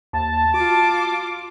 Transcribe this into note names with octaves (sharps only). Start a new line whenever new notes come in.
D#2 A5
F4 F#4 D6